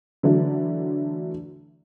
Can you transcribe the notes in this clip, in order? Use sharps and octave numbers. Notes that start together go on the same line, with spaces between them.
D3 E3 F#3 A3 D4